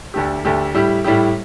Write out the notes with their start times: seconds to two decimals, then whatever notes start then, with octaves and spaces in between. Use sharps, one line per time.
0.14 D2 D3 A3 G4
0.45 D2 D3 A3 G4
0.74 A2 G3 E4 G4
1.04 A2 G3 E4 G4